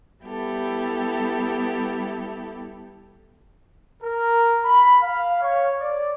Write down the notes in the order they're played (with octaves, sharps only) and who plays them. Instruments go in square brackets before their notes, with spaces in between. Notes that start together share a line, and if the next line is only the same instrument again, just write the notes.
[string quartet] G3 B3 E4 G4 A4
[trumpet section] A#4
B5
F5
C#5
D5